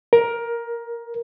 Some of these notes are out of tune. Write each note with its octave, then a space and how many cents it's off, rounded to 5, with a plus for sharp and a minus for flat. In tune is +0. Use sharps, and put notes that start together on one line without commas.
A#4 +15